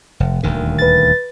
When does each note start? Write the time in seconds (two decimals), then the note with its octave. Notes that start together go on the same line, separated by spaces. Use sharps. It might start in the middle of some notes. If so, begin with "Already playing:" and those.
0.20 F1
0.43 D#1 D2 D#3
0.78 B4 A6